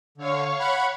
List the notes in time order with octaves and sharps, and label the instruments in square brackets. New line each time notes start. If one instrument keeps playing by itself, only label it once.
[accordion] D3 [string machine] C#5 F5 C#6
[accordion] F#5 B5